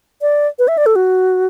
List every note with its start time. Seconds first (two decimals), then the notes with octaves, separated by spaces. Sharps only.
0.22 D5
0.59 B4
0.68 E5
0.78 D5
0.86 A4
0.96 F#4